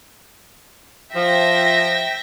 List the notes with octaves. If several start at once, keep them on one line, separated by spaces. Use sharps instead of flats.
F3 E5 G5 A#6